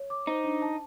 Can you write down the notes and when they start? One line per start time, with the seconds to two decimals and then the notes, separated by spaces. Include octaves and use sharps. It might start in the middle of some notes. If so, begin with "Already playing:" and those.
Already playing: C#5
0.10 D6
0.27 D#4 C5
0.44 D4
0.62 A5